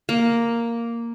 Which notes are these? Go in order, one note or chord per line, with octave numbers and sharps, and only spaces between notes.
A#3